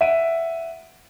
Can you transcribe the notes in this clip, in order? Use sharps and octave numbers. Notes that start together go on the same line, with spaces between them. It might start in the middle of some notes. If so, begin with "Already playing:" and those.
E5 F#5 D7 D#7